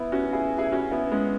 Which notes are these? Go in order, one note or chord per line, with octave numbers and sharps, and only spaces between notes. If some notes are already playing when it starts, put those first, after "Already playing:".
Already playing: B3 E4
C#4 F#4
E4 G#4
E4 G#4
C#4 F#4
B3 E4
G#3 C#4